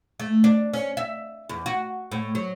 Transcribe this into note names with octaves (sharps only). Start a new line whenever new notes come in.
A3
D4
C#4
E5
E2
F#4
A2
F#3